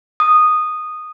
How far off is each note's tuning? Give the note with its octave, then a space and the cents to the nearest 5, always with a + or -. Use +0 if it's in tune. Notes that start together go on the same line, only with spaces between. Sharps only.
D#6 -10